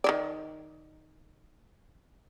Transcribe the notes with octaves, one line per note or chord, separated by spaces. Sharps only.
D#3 E3 D5